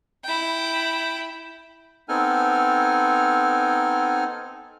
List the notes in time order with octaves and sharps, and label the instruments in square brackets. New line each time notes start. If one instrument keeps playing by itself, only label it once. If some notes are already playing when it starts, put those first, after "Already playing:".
[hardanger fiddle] E4 G5
[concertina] B3 C4 D#4 A4 G#5 F6